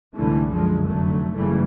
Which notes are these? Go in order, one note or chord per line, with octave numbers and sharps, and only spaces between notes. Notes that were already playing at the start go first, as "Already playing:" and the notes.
C2 G#2 D3 E3 G3 A3
F#2 D3 F3 G#3
F1 D3 F#3 A3
F#1 G#2 C#3 E3 G3 A3